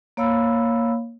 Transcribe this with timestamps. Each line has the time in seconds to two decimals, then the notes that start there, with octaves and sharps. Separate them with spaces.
0.17 A#3 C#5 F5 B5 E6